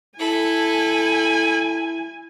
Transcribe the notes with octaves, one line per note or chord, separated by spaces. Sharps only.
E4 A4 G#5 B5